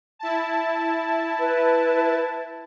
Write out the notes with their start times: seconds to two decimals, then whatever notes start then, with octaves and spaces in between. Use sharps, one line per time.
0.19 E4 A5
1.40 B4